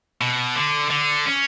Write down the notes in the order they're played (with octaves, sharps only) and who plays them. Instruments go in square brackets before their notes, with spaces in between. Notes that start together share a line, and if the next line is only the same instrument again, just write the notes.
[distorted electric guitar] B2
D3
D3
C#4